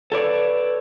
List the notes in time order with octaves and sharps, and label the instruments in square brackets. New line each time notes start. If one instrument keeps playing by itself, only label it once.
[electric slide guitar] A4 C#5 D5 [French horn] B4